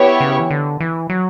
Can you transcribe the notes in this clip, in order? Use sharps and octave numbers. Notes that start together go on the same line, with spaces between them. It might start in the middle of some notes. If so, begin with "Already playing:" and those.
Already playing: B3 E4 G4 C#5
C#3
E3
D3
E3
F#3